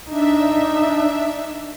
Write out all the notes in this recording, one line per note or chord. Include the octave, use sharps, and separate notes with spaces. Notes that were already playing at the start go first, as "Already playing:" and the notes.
D4 D#4 E5